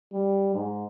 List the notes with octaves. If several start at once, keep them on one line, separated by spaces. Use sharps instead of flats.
G3
G#2